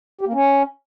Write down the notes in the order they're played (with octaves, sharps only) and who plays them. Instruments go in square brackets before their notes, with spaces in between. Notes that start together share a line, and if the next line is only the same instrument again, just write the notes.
[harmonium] G4
A#3
C#4